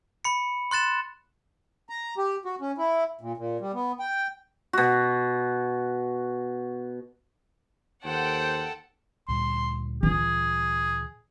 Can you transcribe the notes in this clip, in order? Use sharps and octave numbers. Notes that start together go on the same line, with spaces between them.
B5 C#7
C6 F#6 A6 E7
A#5
G4
F#4
C#4
E4
A#2
A#2
G3
B3
G5
B2 F#4
D#2 A4 C5 F#5 G5
D2 A#2 G3 C6
E3 F4 G#4